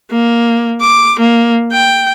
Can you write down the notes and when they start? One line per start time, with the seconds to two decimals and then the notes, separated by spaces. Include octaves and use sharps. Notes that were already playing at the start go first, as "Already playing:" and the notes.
0.11 A#3
0.81 D6
1.19 A#3
1.72 G5